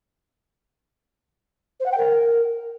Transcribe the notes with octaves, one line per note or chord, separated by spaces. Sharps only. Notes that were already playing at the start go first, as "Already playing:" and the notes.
C5
F#5
G5
A#4